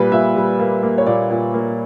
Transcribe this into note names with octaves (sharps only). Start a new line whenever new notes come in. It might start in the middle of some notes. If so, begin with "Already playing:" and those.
Already playing: A#2 G3 B4
A#2 E5
G3
A#3
A#3
C#5
A#2 D5
A#2
A#3